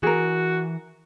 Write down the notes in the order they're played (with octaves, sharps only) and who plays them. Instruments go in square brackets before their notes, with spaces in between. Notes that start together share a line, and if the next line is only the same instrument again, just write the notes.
[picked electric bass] E3 [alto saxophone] F#4 [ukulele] G#4 A#4